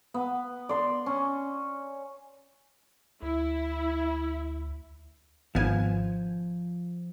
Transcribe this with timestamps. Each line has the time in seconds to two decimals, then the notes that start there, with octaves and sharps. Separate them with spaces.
0.14 B3
0.69 D5 C6
1.06 C#4
3.22 D2 E4
5.55 G#1 F3 B3 G#5